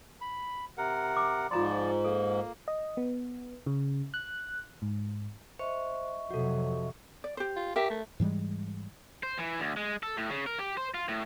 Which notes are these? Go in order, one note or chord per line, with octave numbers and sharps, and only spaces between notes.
B5
C3 A#4 F#5
D6
G#2 F3 F4 D5 A#5 C6
A#3 A4
D#5
B3
C#3
F#6
G#2
C5 D#5 E5 C#6
F2 C3 F#3 F#4 A4
D5
G4 C5
F4
G4 A#4 E5
A3
G#2 E3 G3 G#3
C5
E3
D2
G#3
A4
A2
C#3
A#4
G4
C5
F4
A2